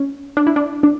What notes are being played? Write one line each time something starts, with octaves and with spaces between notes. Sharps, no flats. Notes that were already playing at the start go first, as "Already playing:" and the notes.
Already playing: C#4
D4
E4
D4
D4